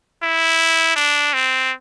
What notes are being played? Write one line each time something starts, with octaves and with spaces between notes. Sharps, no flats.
E4
D4
C4